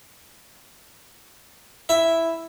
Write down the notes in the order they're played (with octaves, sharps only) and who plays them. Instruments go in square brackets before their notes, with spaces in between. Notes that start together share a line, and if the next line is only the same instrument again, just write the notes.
[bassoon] E4 [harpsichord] E5